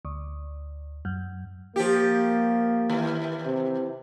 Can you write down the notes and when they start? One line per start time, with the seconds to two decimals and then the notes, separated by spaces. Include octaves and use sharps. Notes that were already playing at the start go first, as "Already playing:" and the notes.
0.05 D2
1.05 F#2
1.76 F3 A#3 G4
2.90 D#2 E3
3.46 C3